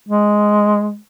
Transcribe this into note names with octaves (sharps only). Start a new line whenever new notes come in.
G#3